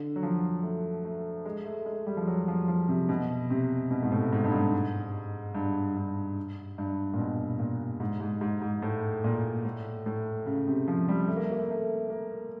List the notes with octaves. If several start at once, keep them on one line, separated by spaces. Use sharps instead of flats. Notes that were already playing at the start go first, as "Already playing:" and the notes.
Already playing: D3
F#3
F3
A3
A3
G#3
A3
G#3
G3
F3
F#3
F3
F3
C3
B2
C3
B2
G#2
A2
G#2
G2
G#2
G2
G2
G2
A#2
B2
A#2
G#2
G#2
G#2
G#2
A2
A#2
A2
A2
C#3
C3
F3
G3
A3
A#3
A3
A#3
A3
A3
A#3